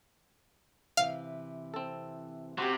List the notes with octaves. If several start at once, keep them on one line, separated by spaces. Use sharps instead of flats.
C3 E3 F5
C4 A4
C3 F#4 G4